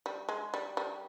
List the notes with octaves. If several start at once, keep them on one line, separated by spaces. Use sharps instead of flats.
G3
G#3
G3
G3